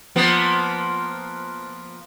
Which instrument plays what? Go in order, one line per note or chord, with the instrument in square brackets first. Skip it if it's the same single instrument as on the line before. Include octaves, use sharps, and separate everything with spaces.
[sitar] F3 A#3 B3